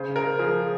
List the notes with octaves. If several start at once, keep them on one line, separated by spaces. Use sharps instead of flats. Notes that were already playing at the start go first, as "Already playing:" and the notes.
Already playing: C#3 C5
A#4
F3 G#4